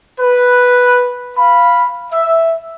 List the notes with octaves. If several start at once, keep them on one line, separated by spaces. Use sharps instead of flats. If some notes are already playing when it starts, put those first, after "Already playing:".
B4
F5 B5
E5